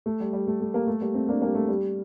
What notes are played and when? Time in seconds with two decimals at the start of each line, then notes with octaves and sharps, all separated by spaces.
0.06 A3
0.20 G3
0.33 G3
0.47 A3
0.61 A3
0.74 G3 A#3
0.87 A3
1.01 G3 A#3
1.14 A3 C4
1.29 A#3 D4
1.42 G3 A#3
1.55 A3
1.68 G3